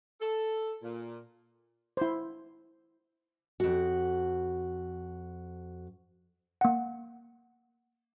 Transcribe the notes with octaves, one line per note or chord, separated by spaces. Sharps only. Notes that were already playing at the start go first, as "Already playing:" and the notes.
A4
A#2
E4 C5
F2 F#4
A#3 F#5